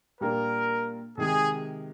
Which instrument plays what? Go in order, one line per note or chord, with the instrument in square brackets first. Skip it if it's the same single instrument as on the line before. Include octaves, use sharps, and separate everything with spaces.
[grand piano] A#2 G3 A#3 D4 [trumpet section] A#4
[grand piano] C3 D#3 G#3 [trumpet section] G#4